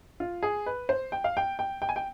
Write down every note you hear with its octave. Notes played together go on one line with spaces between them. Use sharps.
F4
G#4
B4
C5
G5
F5
G5
G5
G5
G#5
G5